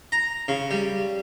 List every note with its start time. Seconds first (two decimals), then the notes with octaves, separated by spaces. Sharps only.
0.12 A#5
0.48 C#3
0.71 G3